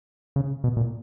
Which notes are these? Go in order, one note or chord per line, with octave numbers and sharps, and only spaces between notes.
C#3
B2
A#2